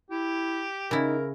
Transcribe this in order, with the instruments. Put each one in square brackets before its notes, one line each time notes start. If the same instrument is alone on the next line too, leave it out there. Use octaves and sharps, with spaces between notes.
[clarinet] E4 [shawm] G4
[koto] C#3 E4 [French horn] D#4 [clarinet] A#4